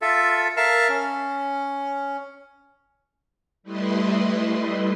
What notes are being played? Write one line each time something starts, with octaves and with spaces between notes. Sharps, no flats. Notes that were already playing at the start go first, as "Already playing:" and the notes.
F4 A4 E5
A#4 E5 F5 A5
C#4
G3 A3 E4 B4 D#5 C6